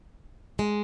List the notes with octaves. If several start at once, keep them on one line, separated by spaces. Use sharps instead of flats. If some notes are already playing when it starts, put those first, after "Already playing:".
G#3